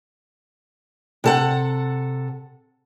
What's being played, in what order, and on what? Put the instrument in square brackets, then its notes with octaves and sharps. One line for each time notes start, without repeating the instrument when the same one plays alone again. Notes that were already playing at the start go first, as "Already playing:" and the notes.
[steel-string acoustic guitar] C3 A4 F#5